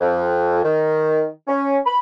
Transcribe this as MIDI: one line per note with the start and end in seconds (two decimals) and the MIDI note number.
0.01 0.62 41
0.64 1.26 51
1.47 1.78 61
1.86 1.99 83